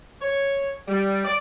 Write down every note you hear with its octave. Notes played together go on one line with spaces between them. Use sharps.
C#5
G3
D5